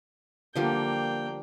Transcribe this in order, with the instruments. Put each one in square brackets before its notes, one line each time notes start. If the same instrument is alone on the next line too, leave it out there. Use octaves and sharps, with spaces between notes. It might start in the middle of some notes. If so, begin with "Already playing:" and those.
[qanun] D3 F3 G3 [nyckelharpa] A#3 G5